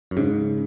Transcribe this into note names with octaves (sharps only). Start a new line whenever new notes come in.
F#2
G#2 C#3